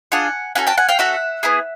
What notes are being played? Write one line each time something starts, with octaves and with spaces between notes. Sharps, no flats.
D4 F4 G#4 F#5 G#5
C#4 F#4 A4 F#5 G#5
G5 A5
F#5 G#5
F5 G5
C#4 F#4 A4 E5 F#5
B3 E4 G#4